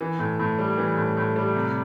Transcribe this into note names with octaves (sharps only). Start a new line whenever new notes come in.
E3
A2
A2
G3
E3
A2
A2
G3
C3